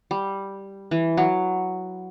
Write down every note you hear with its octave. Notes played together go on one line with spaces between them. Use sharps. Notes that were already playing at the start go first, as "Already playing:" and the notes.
G3
E3
F#3